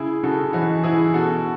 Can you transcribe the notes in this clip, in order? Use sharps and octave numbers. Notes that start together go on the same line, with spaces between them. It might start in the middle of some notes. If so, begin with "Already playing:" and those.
Already playing: C#3 E4 G#4
C#3 F#4 A4
E3 D#4 F#4
E3 E4 G#4
B2 F#4 A4